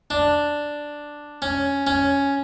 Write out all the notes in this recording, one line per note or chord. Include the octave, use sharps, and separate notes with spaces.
D4
C#4
C#4